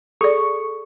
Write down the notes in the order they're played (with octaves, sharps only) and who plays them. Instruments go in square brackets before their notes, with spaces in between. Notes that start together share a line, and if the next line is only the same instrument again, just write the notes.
[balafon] G#4 D5 [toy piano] A4 [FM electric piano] C#6